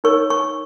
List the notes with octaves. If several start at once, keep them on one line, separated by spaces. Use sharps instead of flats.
D#4 A#4 C#5 C#6
C#6